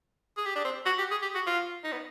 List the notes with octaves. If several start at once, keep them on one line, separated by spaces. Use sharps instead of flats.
G#4
G4
D4
C4
F#4
G4
G#4
G4
F#4
F4
D#4
B3